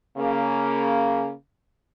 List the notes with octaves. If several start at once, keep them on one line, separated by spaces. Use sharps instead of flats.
C#3 A#3